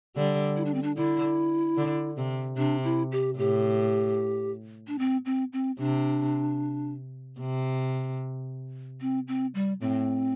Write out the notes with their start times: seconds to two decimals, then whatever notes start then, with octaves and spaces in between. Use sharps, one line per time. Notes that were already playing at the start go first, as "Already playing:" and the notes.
0.16 D3 G3
0.56 E4
0.65 D4
0.74 C4
0.83 D4
0.97 D3 E4
1.77 D3
2.17 C3
2.57 C3 D4
2.84 E4
3.12 G4
3.38 A2 G4
4.88 D4
4.99 C4
5.25 C4
5.53 C4
5.79 C3 D4
7.40 C3
9.01 C4
9.28 C4
9.55 G3
9.81 A2 C4